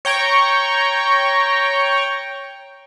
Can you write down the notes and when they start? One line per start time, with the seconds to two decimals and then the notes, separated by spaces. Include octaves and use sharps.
0.05 C#5 G5 A#5 C#6